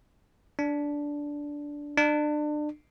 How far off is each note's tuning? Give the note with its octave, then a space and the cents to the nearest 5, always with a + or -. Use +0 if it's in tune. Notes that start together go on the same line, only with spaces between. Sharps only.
D4 -10
D4 +30